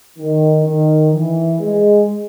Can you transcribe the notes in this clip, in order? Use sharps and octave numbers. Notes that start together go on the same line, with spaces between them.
D#3
D#3
E3
G#3